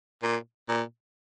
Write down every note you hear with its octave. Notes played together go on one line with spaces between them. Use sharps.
A#2
A#2